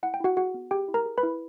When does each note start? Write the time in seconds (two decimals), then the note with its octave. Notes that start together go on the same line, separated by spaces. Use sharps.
0.03 E4 F#5
0.14 G5
0.20 E4 F#4 F#5
0.36 F#4 G#4 F#5
0.54 B3
0.71 G4 G#4 G5
0.88 E4
0.94 A#4 A#5
1.06 G#4
1.18 B4 B5
1.23 E4